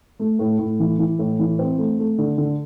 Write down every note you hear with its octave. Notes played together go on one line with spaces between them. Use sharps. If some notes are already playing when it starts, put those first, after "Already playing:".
A3
A2
A2
E3
E3
A2
E3
C4
A3
A3
D3
D3